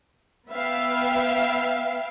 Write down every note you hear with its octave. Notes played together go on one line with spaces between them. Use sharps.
B3 B4 E5 F5 G5